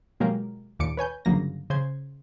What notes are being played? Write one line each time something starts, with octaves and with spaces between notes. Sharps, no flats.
B2 F#3 G#3 A#3 G4 A#4
D#2 A#2 D6 C#7 D7
B4 C#5 G#5 G6
G1 C#3 F#3 A#3 A#6
C#3 C5 C6 G#6